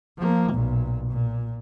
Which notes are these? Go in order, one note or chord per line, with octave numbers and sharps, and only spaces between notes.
F3 A#3
B1 A#2
A#2